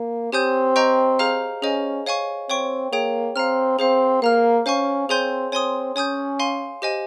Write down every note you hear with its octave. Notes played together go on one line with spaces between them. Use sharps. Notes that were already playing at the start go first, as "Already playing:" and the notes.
Already playing: A#3
C4 G4 C#5 G#5 D#6 G6
D#5 G5 A#5 C#6 G6
G#4 C5 F5 A#5 F6
C#4 G#4 C5 D#5 G#5
C#5 F5 G#5 C#6
C4 C#5 G5 C#6
A#3 G#4 C#5 G5
C4 F5 A#5 F6
C4 G#4 C5 F5
A#3 F5 A#5 F6
C#4 C5 F5 G#5 C#6
C4 G#4 C#5 G#5 C6 G6
C4 C#5 G#5 C6 D#6
C#4 C#5 G#5 D#6 G6
F5 G#5 C6
G4 C5 D#5 G#5